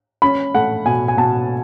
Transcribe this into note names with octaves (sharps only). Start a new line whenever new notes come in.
C#4 B5
A3 F#5
B2 G#5
G#5
B2 A5